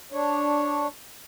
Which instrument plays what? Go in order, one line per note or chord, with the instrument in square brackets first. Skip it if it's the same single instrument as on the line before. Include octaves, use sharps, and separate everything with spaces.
[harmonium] D4 C#5